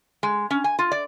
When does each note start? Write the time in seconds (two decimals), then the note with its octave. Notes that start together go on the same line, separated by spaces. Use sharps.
0.23 G#3
0.51 C#4
0.64 G#5
0.79 F4
0.92 D5